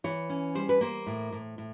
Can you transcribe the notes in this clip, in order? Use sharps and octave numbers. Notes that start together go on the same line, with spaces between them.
E3 C#5
C#4
G3 C5
B4
A#3 C5
A2
A2
A2